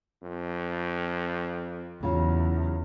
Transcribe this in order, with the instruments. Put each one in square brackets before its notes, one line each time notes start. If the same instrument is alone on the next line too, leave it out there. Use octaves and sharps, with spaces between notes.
[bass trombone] F2
[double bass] E2 [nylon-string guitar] C#3 F#3 F4